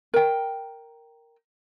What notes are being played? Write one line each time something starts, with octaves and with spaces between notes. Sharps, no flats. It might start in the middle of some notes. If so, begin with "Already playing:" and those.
A#4 G5